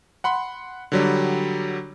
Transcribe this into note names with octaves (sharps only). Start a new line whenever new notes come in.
F#5 B5 C6
D3 F#3 G3